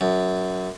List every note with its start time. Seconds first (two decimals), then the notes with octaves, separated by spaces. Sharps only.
0.01 F#2